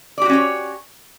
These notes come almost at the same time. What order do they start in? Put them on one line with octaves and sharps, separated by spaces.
D5 G4 F#4 C#4 C#5